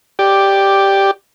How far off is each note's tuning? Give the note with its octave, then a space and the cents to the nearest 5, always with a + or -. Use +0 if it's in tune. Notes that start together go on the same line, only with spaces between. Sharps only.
G4 +0 D5 +0